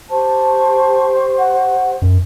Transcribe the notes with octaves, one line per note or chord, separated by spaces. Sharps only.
G4 C5 A5 C#6
F#5
F#2